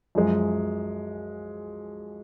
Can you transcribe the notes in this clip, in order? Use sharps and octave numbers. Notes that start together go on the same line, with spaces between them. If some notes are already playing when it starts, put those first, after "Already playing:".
F#2 F3 G#3